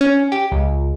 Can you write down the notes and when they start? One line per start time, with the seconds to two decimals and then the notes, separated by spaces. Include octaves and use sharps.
0.01 C#4
0.32 G4
0.52 C#2